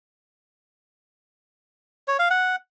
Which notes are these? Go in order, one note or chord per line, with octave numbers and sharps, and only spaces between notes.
C#5
F5
F#5